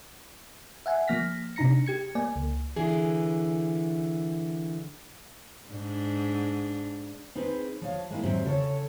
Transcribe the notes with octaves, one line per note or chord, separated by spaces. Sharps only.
E5 F#5 G#5
F3 A#3 F6 A#6 B6
C3 D4 D#4 A#5 A#6 C#7
G4 G#6 C#7
A#3 D5 G#5
C#2
D3 E3 G#4
G#2 D4
C4 D#4 G#4 B4
F3 C#5 F5
G#3 A#3 E4
G#2 F#3 C4 E5
C#3 A4 C5 C#5